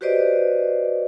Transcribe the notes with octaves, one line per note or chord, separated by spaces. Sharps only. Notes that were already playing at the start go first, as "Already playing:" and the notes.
F#4 G4 B4 C5 D5 D#5